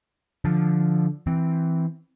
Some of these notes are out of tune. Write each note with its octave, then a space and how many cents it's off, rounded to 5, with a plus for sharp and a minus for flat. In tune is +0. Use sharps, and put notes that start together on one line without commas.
D3 +0 F3 -5
E3 +0 C4 +0